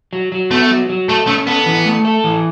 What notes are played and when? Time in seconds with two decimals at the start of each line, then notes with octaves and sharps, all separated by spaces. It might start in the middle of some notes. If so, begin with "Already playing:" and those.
0.13 F#3
0.32 F#3
0.51 A3 B3
0.70 F#3
0.89 F#3
1.08 A3 A4
1.27 A3 C#4
1.47 B3 A4
1.66 E3
1.85 A3
2.05 A4
2.24 E3